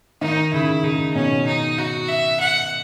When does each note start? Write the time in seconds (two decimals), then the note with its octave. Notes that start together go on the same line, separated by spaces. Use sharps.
0.21 D#3 D#4
0.53 C#3 E4
0.83 C#3 D#4
1.15 B2 C#4
1.47 D#4
1.78 F#4
2.09 E5
2.40 F#5